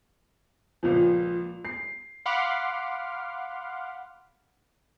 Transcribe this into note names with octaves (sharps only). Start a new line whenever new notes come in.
C#2 A#2 F3
C7
F5 F#5 B5 C6 D6 F6